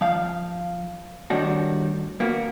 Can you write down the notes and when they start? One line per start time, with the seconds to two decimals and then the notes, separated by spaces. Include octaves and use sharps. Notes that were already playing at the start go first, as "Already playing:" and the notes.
0.01 F3 F5
1.30 A2 D#3 G3 D4 D#4 F#4
2.20 A#3 B3 F#4